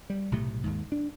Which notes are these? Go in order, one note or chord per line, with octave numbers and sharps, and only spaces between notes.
G3
B1 A2 C3 A3
D#2 G#2
D4